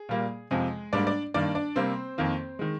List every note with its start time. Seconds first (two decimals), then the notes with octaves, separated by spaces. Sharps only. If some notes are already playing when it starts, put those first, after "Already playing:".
Already playing: G#4
0.09 A#2 G3 A#3
0.51 F2 C3 F3 G#3 G#4
0.93 G#2 G3 A#3 D4 D5
1.07 D4 D5
1.34 G2 D#3 A#3 D4 D5
1.55 D4 D5
1.76 C3 G3 A#3 C4 C5
2.18 F2 D#3 A#3
2.59 D#3 G#3